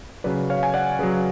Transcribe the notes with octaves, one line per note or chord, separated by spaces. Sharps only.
C#3 F#3 B4 D5
C#5 F5
G#5
D5 F#5
C#3 F#3 G#4 B4